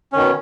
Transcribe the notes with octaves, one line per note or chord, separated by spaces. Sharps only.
B2 D#3 C#4